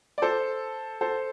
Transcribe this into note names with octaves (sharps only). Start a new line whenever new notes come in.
D5
A4 C5
A4 C5